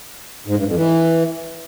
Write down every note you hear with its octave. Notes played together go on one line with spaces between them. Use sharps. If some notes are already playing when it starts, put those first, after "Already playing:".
G#2
G2
F2
E3